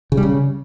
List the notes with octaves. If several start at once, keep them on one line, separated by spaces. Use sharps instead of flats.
C#3
G3
C#3